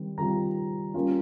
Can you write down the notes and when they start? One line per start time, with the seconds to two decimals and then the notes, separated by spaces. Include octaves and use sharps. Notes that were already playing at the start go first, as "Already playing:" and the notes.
Already playing: D#3 G3 C4
0.18 D#3 G3 C4 F4 A#5
0.94 G3 A#3 C#4 F4